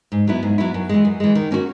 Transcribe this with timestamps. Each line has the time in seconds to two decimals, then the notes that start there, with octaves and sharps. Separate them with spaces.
0.12 G#2
0.27 F#3 B3 E4
0.43 G#2
0.58 F#3 B3 E4
0.74 F#2
0.89 E3 G#3
1.05 F#2
1.20 E3 G#3
1.35 D#3
1.51 A#3 C#4 F#4